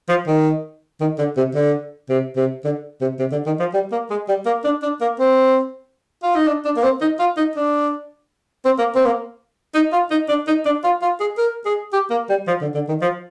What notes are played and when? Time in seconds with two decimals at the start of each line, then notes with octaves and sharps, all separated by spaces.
0.09 F3
0.27 D#3
1.00 D#3
1.18 D3
1.37 C3
1.55 D3
2.09 C3
2.36 C3
2.64 D3
3.01 C3
3.19 C3
3.32 D3
3.46 D#3
3.59 F3
3.73 G3
3.92 A#3
4.10 G#3
4.28 G3
4.46 A#3
4.64 D4
4.82 D4
5.01 A#3
5.19 C4
6.23 F4
6.35 D#4
6.47 D4
6.65 D4
6.76 A#3
6.83 C4
7.01 D#4
7.19 F4
7.37 D#4
7.55 D4
8.65 C4
8.78 A#3
8.95 C4
9.06 A#3
9.74 D#4
9.92 F4
10.11 D#4
10.29 D4
10.47 D#4
10.65 D4
10.84 F4
11.02 F4
11.20 G#4
11.38 A#4
11.65 G#4
11.93 G4
12.10 A#3
12.29 G3
12.47 F3
12.61 D3
12.74 D3
12.88 D#3
13.02 F3